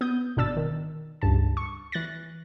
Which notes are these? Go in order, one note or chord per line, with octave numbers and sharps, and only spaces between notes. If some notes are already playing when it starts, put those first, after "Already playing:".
B3 D#6 G6
G#1 B2 D4 E6 A6
D#3
C#2 G2 A5
C#6
E3 F#6 A6 A#6